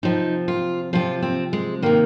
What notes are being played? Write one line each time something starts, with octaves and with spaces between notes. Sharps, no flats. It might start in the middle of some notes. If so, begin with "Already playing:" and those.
C3 F3 D#4
F4
C3 F3 F4
C4
G#3
C3 D#3 A#3